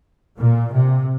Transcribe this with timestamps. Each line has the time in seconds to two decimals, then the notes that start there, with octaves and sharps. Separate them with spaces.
0.38 A#2
0.72 C3